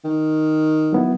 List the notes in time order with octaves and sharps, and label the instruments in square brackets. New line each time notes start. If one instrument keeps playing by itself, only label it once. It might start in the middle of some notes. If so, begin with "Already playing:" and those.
[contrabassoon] D#3
[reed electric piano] F#3 B3 E4